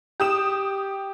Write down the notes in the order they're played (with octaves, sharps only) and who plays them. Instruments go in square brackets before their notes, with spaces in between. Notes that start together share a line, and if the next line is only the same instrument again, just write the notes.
[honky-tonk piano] G4 D#6 E7